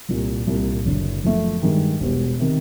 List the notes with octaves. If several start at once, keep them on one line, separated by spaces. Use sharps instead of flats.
C2 A#2 G3
C2 A#2 G3
F#1 F#2 D3
F#2 D3 F3 A3
G2 D#3 G#3
E1 E2 B2 G3 B3
C3 D#3